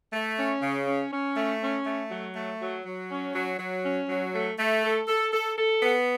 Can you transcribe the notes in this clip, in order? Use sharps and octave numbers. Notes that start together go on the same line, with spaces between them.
A3
C#4
C#3
C#4
C#4
A3
C#4
A3
F#3
A3
F#3
F#3
C#4
F#3
F#3
C#4
F#3
A3
A3
A4
A4
A4
A4
B3